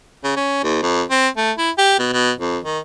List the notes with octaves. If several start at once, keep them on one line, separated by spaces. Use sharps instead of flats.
C#3
C#4
D#2
F2
C4
A3
E4
G4
B2
B2
F2
D#3